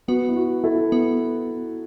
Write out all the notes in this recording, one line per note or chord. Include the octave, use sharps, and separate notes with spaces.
B3 F#4 B4
E4
F#4
E4 A4
B3